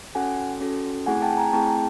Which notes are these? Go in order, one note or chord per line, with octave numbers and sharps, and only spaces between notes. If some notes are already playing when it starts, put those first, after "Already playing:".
C#4 F#4 A4 F#5 G#5
C#4 F#4 A4
A3 C4 E4 G#4 F#5 G#5
G5 A5
G#5 A#5
A3 C4 E4 G#4 G5 A5